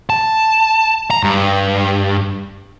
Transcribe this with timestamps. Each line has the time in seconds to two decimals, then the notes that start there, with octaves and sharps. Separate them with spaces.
0.10 A5
1.11 A#5
1.23 G2